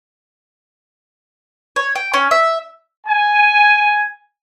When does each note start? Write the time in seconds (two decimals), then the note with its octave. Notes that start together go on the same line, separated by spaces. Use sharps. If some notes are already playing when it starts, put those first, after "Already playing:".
1.76 C#5
1.95 G5
2.14 C#4
2.31 E5
3.07 G#5